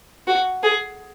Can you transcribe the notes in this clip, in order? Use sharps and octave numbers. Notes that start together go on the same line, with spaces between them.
F#4
G#4